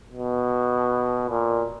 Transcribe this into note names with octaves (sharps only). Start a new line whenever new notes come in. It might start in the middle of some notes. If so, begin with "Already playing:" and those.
B2
A#2